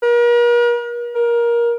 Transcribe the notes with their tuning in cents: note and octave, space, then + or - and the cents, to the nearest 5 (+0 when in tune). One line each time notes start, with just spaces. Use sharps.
A#4 +45
A#4 +20